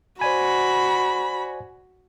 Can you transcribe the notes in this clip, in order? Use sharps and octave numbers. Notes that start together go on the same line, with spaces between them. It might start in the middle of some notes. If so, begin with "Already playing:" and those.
F#4 C5 D5 G#5 B5